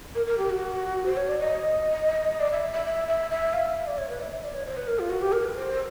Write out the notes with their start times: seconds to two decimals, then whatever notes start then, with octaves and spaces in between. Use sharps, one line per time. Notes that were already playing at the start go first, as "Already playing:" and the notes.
0.15 A#4
0.26 A#4
0.38 G4
0.49 F#4
1.06 C5
1.17 C#5
1.28 D5
1.39 D#5
2.40 D5
2.51 E5
2.73 E5
2.85 E5
3.08 E5
3.30 E5
3.53 F5
3.75 E5
3.86 D5
3.98 C#5
4.09 B4
4.20 E5
4.31 E5
4.43 D5
4.54 C#5
4.66 C5
4.77 B4
4.87 A#4
4.99 F4
5.10 F#4
5.21 G4
5.32 A#4
5.44 B4
5.55 C5